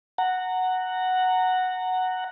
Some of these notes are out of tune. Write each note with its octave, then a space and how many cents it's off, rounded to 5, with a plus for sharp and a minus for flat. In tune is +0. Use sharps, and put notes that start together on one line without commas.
F#5 +0 A#5 -20